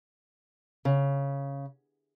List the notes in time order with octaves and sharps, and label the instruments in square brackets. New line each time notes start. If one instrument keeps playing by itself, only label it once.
[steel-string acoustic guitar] C#3